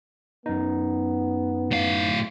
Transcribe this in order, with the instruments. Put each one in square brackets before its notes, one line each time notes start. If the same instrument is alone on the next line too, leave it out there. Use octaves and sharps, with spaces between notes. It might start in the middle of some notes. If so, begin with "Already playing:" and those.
[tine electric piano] F#2 D#4 [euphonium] B3
[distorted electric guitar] A2 F5